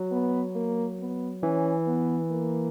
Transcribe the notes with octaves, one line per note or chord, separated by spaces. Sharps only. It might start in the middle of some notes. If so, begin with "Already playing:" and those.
Already playing: F#3
B3
A#3
B3
E3 C#4
B3
A#3